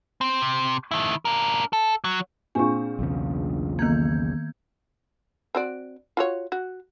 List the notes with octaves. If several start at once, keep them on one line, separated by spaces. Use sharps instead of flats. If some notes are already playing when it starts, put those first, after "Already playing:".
C4
C3
D#3 E4
D4 A#4
A4
F#3
A#2 C4 D4 F4 G#4 G#5 C#6
B1 E2 C#3
D#3 A#3 B3 G6 G#6
C4 F#4 D5
F4 F#4 C#5
F#4